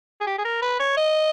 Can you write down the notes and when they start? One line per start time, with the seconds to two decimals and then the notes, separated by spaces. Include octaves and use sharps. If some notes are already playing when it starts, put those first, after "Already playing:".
0.21 G#4
0.27 G4
0.39 G#4
0.45 A#4
0.62 B4
0.80 C#5
0.97 D#5